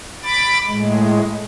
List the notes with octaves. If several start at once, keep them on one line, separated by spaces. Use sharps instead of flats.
B5 D6 A6
A2 G#3